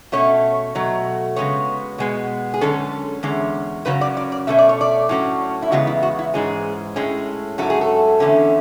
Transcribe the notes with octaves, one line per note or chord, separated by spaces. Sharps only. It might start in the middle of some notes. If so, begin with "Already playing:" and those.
B2 A3 C#4 C#5
B2 F#3 A3
C#3 G#3 B3 C#5
B2 G#3 B3
G#4
F#2 D3 G#3 C#4 A4
E2 D3 G#3 C#4
F#2 C#3 F#3 C#4 B4
D5
D5
D5
B2 A3 C#4 E5
D5
C#5
D5
A2 F#3 C#4
E4
E2 C#3 G#3 B3 F#4
E4
F#4
E4
G#2 E3 G#3 C#4 G#4
A2 G#3 C#4
G#2 F#3 A3 C#4 A4
G#4
A4
E2 D3 A3 C#4